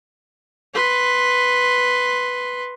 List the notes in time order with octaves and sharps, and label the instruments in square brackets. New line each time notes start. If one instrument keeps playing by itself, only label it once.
[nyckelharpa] B4 C6